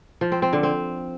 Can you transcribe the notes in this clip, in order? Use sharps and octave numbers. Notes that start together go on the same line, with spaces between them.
F3
C4
C4
D3
C4